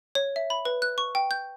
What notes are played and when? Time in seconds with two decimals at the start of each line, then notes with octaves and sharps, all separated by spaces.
0.15 C#5
0.36 E5
0.50 B5
0.65 B4
0.82 F#6
0.98 C#6
1.15 G5
1.31 G6